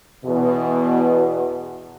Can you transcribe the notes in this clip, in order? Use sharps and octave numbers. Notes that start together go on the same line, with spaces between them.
E2 B2